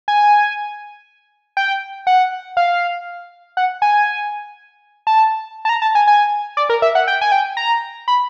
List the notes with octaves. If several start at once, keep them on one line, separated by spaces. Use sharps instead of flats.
G#5
G5
F#5
F5
F#5
G#5
A5
A5
A#5
A5
G#5
G#5
D5
A#4
E5
F#5
G5
G#5
G5
A#5
B5